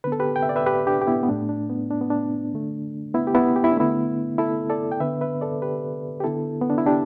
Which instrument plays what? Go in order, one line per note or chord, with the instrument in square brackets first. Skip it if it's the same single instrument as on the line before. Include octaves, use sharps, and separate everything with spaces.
[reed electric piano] D3 B3 B4
A4
G4 B4
G5
E5
D5
B4 E5
G4 B4
D4 G4
G4
B3 E4
B3
A2 A3 D4
D4
B3
D4
B3
D4
D3 A3
B3 E4
G4
B3 E4
G4
E4
D4
D3 A3 B3 E4
E4 A4
A4 D5
G5
D3 B3 B4 E5
B4 E5
A4 D5
G4 B4
G4
D3 B3 E4 A4
B3
D4
E4
D4 G4